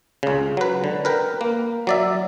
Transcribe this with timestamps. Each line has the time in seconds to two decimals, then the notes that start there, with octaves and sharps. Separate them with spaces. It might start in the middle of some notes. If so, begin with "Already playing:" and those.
0.23 C#2 C#3
0.57 F#3 B4
0.84 D3
1.05 A#4 B4 G5
1.41 A#3
1.87 F#3 D5 E5